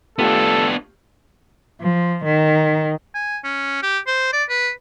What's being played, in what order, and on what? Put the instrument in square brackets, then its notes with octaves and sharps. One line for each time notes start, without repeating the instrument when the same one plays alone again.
[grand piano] A3 F4 G4 [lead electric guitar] B3 D4 [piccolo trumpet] A4
[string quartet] F3
D#3
[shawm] G#5
C#4
G4
C5
D5
B4